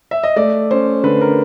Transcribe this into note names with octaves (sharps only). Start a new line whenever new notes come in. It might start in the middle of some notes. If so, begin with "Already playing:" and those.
E5
D#5
A3 D5
C#4 C5
D3 B4
A#4